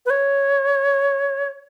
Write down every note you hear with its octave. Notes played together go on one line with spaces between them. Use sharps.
B4
C#5